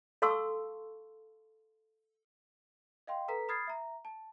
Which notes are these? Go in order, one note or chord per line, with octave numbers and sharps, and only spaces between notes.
A4 F5 A5 C6 C#6 E6
D#5 F5 G5 C6
A4 B4 A#5 B6
B5 D#6 F6 G#6 A6 C7
E5 A#5
A5